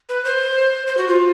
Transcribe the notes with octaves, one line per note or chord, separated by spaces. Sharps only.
B4
C5
C5
F#4
F4